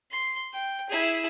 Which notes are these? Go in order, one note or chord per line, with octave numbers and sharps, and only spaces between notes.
C6
G5
E4 G#4